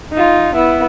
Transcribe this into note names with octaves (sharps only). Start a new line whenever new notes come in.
D#4 F4
B3 E4